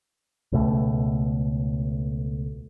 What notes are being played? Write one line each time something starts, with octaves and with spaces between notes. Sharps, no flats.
C#2 B2 A3